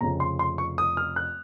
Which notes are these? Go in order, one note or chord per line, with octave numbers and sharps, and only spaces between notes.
F1 F2 C#3 A#5
C6
C6
C#6
D#6
F6
F#6